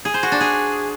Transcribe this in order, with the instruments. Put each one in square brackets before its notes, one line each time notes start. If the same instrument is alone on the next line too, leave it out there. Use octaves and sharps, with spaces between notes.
[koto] G#4
C5
F#4
D4
G#4